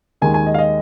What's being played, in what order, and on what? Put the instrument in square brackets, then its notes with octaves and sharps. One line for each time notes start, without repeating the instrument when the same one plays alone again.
[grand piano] D#2 D#3 G#3 G#5
G#5
D#5
F5
D#5